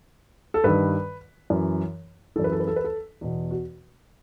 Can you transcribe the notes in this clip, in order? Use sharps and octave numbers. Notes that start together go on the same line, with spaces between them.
A4
G2 D#3 B4
F#2 E3
F#2 E3 A4
B4
A4
B4
A4
B4
A4
E2 B2
F#4